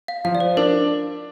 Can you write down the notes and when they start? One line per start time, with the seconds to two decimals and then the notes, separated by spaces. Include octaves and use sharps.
0.08 F5
0.25 F3 F5
0.35 D5
0.40 C5
0.57 D4 A#4